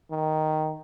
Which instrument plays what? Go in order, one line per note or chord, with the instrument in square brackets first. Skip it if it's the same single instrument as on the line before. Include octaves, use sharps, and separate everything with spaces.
[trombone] D#3